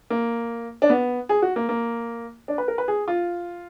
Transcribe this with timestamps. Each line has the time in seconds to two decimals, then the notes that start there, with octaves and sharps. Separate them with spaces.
0.10 A#3
0.82 D4
0.90 B3
1.29 G#4
1.42 F#4
1.56 A#3
1.69 A#3
2.48 D4
2.58 B4
2.68 A#4
2.78 B4
2.88 G#4
3.08 F4